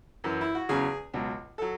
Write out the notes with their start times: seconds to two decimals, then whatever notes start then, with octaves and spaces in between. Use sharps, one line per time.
0.24 F#2 E3
0.41 E4
0.55 F#4
0.69 E2 C#3 F#3 G#4
1.14 C#2 B2 F#3
1.58 F#3 A4